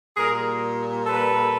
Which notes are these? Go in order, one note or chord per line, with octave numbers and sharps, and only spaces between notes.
A#2 G3 G#4 A#4
A4 B4